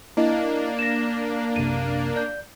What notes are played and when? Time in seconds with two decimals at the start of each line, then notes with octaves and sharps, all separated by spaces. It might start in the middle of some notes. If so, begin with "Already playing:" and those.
0.17 A#3 D4 E4 D#5
0.79 A#6 E7
1.56 B1 F#2 C3 D#7
2.16 D5 G6